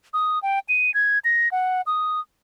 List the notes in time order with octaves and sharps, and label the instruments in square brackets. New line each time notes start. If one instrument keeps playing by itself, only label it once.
[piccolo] D#6
G5
D#7
G#6
A#6
F#5
D#6